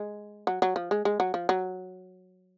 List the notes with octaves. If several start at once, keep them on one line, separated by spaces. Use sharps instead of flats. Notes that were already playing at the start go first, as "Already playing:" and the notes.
Already playing: G#3
F#3
F#3
F3
G#3
G#3
F#3
F3
F#3